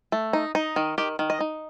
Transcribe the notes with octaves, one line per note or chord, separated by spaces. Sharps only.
A3
D#4
D#4
D#3
D#3 G4
D#3
D#5
D#4